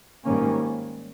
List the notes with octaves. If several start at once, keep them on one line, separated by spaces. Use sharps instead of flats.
G#2 D#3 G3 A#3 C#4